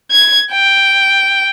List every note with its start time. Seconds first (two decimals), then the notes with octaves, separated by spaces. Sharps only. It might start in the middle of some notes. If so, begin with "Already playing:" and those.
0.11 G#6
0.52 G5